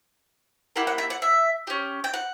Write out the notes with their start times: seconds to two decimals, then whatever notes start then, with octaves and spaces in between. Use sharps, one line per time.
0.76 A#3 E4 G4 F#5
0.87 F#5
0.98 E5
1.10 F#5
1.22 E5
1.67 C#4 G4
2.04 G5
2.14 F#5